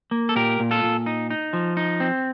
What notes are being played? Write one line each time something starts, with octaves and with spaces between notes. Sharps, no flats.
A#3
A4
A#2 G4 A#4
A#2
F4 A4
A#2
D#4
D#4
F3
D#4
C4